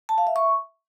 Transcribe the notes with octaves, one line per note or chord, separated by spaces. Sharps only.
A5
F5
E5
C#6